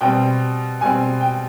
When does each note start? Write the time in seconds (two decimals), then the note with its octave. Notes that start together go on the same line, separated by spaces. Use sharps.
0.01 B2 G3 C4 G5
0.81 B2 G3 C4 G#5
1.21 G5